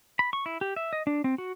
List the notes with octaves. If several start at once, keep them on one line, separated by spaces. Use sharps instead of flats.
B5
C#6
E4
G4
E5
D#5
D4
C4
F#4